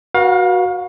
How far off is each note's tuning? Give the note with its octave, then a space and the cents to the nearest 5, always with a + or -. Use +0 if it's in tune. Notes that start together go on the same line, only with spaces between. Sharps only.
F#4 +0 B4 -35 F5 +30